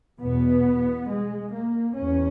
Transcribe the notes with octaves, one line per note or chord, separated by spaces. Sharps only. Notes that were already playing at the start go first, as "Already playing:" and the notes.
E2 B2 B3
G#3
A#3
E2 C#4